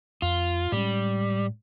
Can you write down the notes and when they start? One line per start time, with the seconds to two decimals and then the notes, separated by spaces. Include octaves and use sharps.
0.22 F2 F4
0.72 A2 G3 G#3 C#4